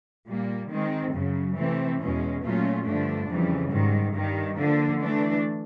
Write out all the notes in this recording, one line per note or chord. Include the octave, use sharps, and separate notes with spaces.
A#2 G3 A#3
D#3 G#3 C4
F#2 C#3 F#3
C3 E3 A3 C4
E2 B2 G#3 C#4
A#2 F#3 A3 C#4 F4
G2 D3 F3 A3 D4
F2 C#3 E3 G3
G#2 D#3 G3
G2 D#3 G3
D3 F3 A#3 D4
E3 A3 D4